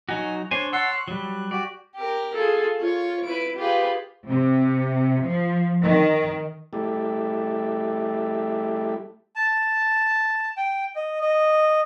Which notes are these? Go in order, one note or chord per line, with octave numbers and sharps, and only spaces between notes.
F#3 D#4 F#4 G#5
D4 C5 C#5 G#5
C#5 F#5 A5 C6 E6
F#6
F#3 G3
F#4 G4 D5
G4 A#4
F4 G#4 A4
F4 C#5
E4 B4 D7
F4 G4 G#4 B4
C3
F3
D#3
G3 A3 E4 G4 A4
A5
G5
D#5
D#5